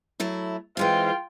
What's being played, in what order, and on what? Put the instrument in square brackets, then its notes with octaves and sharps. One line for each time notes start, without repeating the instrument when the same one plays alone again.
[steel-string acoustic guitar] F#3 A3 E4
[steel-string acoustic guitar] E3 G#3 C4 [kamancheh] F4 G5